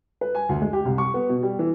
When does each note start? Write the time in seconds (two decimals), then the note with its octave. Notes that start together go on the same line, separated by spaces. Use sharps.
0.21 B4
0.35 G#5
0.49 D2
0.62 G#3
0.73 G4
0.85 C2
0.98 C#6
1.14 B3
1.29 B2
1.43 G3
1.59 E3